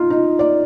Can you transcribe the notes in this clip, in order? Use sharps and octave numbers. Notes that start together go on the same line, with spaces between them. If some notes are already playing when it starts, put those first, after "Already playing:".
Already playing: D#4 F4
D#4
D5